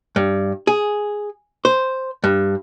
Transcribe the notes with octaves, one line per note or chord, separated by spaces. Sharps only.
G2
G#4
C5
G2